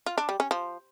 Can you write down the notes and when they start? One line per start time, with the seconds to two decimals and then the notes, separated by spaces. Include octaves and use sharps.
0.06 F4
0.18 D4
0.29 G3
0.40 C#4
0.51 F3